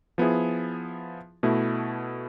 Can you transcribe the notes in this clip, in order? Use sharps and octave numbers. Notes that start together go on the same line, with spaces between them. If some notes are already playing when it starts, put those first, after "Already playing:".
F3 B3 E4 G#4
B2 A3 E4